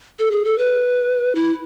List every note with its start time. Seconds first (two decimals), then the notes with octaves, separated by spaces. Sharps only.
0.19 A4
0.31 G#4
0.45 A4
0.58 B4
1.35 E4